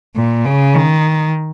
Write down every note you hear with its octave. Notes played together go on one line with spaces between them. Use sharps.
A#2
C#3
D#3